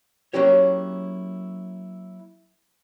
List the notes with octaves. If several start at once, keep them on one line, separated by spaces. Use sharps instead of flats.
F#3 A#3 C#4 E4 G4 C#5